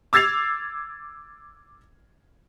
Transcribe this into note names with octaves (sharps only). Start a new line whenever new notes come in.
D6 E6 G#6 A6 C7 F7